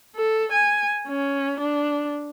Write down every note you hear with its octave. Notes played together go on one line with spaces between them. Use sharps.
A4
G#5
C#4
D4